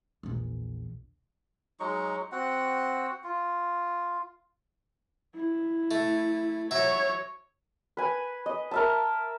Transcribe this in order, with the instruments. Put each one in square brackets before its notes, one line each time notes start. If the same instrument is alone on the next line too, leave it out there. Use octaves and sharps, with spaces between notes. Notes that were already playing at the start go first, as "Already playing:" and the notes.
[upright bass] A#1 E2
[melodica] F#3 G#3 D#4 C#6
C4 F#4 F#5
F4
[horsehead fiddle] E4
[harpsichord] A3
[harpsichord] F#3 E5 [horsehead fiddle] C#5
[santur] B4 G#5
D#5
A#4 E5 A5